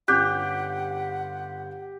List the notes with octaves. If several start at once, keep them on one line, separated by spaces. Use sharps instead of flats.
G1 C#4 F4 G4 F#5 D6 F#6 G6